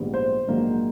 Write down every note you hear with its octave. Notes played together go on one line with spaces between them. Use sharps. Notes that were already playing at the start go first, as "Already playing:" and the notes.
Already playing: A#1 G#2 D#3 G3 B3
C5
A#1 G#2 D#3 F#3 A#3